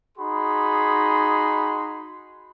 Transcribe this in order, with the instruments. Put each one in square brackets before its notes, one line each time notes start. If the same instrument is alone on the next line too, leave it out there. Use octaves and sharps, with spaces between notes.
[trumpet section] D#4 F#4 G#4 B5 C6